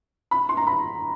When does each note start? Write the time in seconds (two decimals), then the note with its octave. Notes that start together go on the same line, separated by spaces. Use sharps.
0.31 B5
0.49 C6
0.57 A#5
0.67 B5